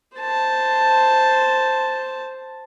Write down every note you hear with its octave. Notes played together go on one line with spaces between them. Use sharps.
C5 A5